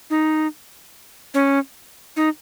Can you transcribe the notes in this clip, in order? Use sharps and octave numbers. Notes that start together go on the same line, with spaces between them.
D#4
C#4
D#4